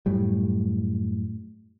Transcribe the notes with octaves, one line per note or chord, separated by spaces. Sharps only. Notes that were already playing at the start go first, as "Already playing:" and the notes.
F#2 A2 G3